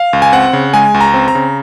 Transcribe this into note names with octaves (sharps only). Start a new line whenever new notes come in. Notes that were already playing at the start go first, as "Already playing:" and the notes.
Already playing: F5
C#2
G#5
C4 F#5
C#3
G#3 G#5
C#2
A#5
C4
A#5
C#3